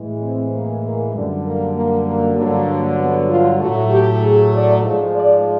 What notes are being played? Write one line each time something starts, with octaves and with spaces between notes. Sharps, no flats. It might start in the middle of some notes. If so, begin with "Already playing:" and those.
Already playing: A2 E3 G#3
C4
A#3
A#3
F#2 D3 G3
A#3
A#3
A#3
G2 D3 F#3 A#3
B3
F4
A2 F#3 A3 F#4
G4
G#4
D5
G#2 F3 G#3
D5